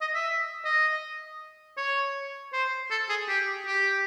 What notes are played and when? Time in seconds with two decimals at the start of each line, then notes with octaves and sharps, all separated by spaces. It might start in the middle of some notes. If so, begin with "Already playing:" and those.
0.01 D#5
0.14 E5
0.65 D#5
1.77 C#5
2.53 C5
2.91 A4
3.09 G#4
3.28 G4
3.66 G4